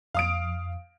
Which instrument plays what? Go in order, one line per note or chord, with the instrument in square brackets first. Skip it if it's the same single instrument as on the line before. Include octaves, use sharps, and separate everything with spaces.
[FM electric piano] F2 [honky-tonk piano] F5 D#6 D7